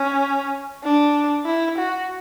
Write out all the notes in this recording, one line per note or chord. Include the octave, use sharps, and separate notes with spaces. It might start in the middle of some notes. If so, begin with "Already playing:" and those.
Already playing: C#4
D4
E4
F#4